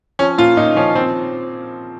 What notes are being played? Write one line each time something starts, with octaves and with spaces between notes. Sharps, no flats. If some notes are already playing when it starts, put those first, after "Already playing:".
F3 C#4
A#2 F4
A#2 D#4
F3 C#4
F3 C4